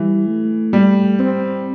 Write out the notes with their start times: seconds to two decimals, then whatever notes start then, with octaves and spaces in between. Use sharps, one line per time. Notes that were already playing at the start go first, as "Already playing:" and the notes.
Already playing: E3 G3
0.26 A3
0.73 G3
1.19 C4